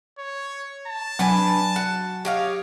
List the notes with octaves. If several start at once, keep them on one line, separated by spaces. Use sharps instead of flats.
C#5
A5
F#3 D4 B4 G#5
F#4
G4 C#5 D#5 F5